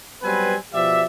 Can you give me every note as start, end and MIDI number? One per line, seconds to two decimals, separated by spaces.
0.22 0.54 54
0.22 0.54 55
0.22 0.54 59
0.22 0.54 60
0.22 0.54 71
0.22 0.54 80
0.73 1.04 47
0.73 1.04 53
0.73 1.04 67
0.73 1.04 74
0.73 1.04 76